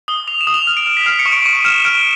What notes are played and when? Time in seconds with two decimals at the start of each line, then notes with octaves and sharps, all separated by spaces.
0.08 D#6 G7
0.27 D#6 F7
0.41 E7
0.47 D#6
0.54 F7
0.67 F6 F7
0.77 D7
0.87 F6
0.97 B6
1.06 F6 C7
1.19 C#7
1.26 C#6
1.32 D7
1.45 C#6 D#7
1.65 F6 E7
1.85 F6 D7